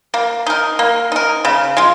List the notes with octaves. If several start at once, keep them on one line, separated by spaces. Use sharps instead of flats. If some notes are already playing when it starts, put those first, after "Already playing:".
A#3
D#4 A#4
A#3
D#4 A#4
C#3
G#3 F4